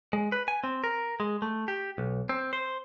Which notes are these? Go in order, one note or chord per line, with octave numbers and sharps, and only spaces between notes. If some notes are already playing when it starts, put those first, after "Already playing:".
G#3
B4
G#5
C4
A#4
G#3
A3
G4
B1
C4
C5